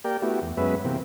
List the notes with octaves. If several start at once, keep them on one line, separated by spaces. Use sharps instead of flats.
A#3 G4 A#4 D5 G5
A3 B3 E4 F#4 G4
E2
F#2 G#3 B3 C#4 B4 E5
C3 E3 A#3 C4